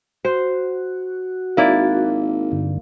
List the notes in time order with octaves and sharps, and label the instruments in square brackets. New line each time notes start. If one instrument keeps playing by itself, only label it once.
[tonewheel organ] F#4 [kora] C5
[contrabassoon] G#1 [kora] A#3 E4 D5
[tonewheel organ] G2 D3